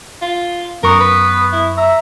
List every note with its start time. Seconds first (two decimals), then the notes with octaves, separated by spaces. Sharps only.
0.22 F4
0.83 F#2 B3 A#4 C#6
1.01 B4
1.52 E4
1.77 E5 A#5